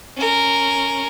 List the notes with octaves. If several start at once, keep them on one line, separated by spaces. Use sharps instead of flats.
C#4 A#4